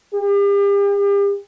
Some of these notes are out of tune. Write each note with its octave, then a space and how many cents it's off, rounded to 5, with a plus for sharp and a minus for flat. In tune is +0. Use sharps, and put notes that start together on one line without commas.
G4 +40